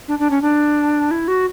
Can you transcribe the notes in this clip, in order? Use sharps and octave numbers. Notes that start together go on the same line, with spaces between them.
D4
D4
C#4
D4
E4
F#4